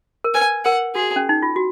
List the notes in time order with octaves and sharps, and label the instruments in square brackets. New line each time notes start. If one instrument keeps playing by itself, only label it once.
[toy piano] A#4
[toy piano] B4 [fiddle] G#5
[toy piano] A#4 [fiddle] F#5
[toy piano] F#4 [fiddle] G#4
[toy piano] C#4
D#4
F4
F#4